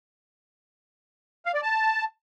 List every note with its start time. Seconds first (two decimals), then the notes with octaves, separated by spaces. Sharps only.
1.46 F5
1.54 D5
1.63 A5